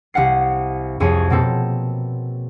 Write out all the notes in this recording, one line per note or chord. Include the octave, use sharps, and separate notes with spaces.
C2 F5 F#5 C7
C2 F2 G#4 C#5
B2 A#3 C4 A4